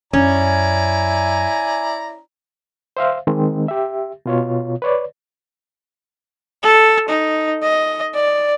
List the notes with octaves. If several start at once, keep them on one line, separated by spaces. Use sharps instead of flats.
F#2 C#4 E4 D5 G#5 A#5
C5 E5 F5
D#3 G#3 C4
G4 E5
B2 F4 C#5
B4 C#5 D5
A4
D#4
D#5
D5